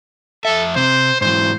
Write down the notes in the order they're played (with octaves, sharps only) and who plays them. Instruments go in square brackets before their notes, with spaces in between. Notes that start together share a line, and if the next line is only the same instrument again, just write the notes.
[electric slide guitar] F2 E5 [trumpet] A4
[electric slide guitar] C3 [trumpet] C5
[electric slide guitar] G#2 E3 [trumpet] C5